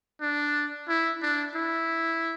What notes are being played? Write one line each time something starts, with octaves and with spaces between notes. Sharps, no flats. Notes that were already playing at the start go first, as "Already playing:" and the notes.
D4
E4
D4
E4